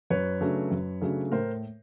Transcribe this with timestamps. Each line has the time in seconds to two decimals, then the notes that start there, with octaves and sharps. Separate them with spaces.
0.10 F#2 B4 C#5
0.41 C#3 F#3 A3 D4
0.71 F#2
1.01 C#3 F#3 A3 D4
1.32 A2 A#4 C5